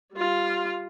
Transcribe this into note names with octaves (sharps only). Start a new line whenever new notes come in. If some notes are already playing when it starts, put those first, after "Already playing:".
G3 F4